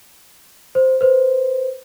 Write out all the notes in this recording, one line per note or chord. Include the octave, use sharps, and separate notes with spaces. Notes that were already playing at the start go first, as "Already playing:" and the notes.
C5
B4 C5